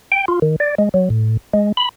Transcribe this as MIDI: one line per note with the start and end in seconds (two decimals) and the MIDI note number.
0.12 0.25 79
0.28 0.39 65
0.42 0.56 51
0.60 0.75 74
0.78 0.89 56
0.94 1.09 54
1.10 1.37 45
1.54 1.72 56
1.77 1.89 83